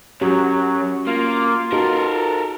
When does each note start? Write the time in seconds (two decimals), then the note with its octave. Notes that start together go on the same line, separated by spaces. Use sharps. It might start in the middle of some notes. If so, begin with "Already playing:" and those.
0.21 F#2 F#3 C#4 F#4 G4
1.07 A#3 F4
1.72 D#4 F#4 A4 A#4